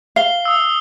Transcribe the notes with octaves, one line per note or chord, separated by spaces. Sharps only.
F5 C7 G7
D#6 E6